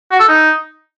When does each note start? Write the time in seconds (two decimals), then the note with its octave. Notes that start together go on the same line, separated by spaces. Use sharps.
0.11 F#4
0.20 A4
0.28 D#4